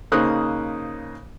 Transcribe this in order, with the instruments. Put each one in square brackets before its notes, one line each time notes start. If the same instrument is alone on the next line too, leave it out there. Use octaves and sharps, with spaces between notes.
[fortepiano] C#3 A#3 D#4 C5 D#6 F#6